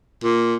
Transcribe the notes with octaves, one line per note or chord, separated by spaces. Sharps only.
A#2